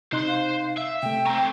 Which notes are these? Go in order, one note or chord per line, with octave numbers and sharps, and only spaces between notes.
C3 D#4 C5 C6 F#6
F5
E5
C3 A3 G5
A3 C4 A#5